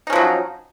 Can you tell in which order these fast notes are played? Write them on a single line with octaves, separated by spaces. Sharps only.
D#4 C#4 F3 F#3